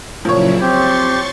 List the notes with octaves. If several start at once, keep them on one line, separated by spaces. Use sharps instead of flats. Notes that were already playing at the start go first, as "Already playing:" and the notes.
A#2 C#3 F3 F#3 E4 C#5
C4 G4 C6 C#6 A6